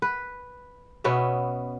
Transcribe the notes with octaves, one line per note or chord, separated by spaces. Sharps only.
B4
B2 B3 C#4 E5